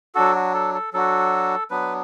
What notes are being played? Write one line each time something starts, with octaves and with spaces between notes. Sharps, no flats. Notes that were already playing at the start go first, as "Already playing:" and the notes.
F#3 D4 F#4 A4
F#4
A4
A4
F#3 D4 F#4 A4
F#3 B3 D4 B4